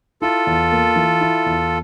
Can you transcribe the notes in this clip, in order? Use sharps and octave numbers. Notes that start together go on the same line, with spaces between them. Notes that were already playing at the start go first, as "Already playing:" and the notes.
E4 F4 A4
E2
A#3
E3
E4
E2